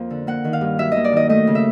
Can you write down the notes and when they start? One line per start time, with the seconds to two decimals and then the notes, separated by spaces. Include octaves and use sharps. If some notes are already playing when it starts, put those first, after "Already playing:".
Already playing: F2 F3 A#3
0.10 D3
0.27 A#3 F#5
0.45 D#3
0.53 F5
0.61 G2
0.78 F#3 E5
0.92 A#3 D#5
1.04 D5
1.12 D#3 D#5
1.29 A3 D#5
1.47 C#3
1.55 E5